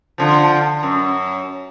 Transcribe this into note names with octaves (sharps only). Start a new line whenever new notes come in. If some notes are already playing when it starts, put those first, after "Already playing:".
D3 F3
F#2